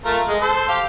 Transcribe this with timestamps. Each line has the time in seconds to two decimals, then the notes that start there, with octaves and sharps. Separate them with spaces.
0.05 A3 F4 A#4
0.28 G#3
0.41 A4 C5
0.68 G4 F5